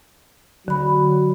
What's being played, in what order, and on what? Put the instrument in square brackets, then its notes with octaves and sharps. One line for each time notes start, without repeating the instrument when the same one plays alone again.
[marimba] D3 B5 [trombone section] F#3